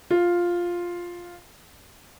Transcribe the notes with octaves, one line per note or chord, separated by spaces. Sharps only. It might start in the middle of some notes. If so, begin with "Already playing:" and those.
F4